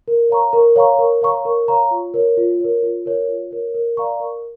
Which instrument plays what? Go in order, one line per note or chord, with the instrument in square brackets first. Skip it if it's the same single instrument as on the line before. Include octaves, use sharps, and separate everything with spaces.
[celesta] A#4
C#5 F5 A#5 C#6
A#4
C#5 F5 A#5 C#6
A#4
C#5 F5 A#5 C#6
A#4
C#5 F5 A#5 C#6
F4
A#4 C#5
F4
A#4 C#5
F4
A#4 C#5
F4
A#4 C#5
A#4
D5 F5 A#5 C#6
A#4